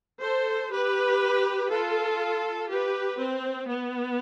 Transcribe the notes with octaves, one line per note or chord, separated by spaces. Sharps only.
A4 C5
G4 B4
F4 A4
G4 B4
C4
B3